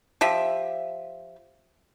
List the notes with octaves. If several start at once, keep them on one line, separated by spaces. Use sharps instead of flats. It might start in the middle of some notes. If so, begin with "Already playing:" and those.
F3 G4 E5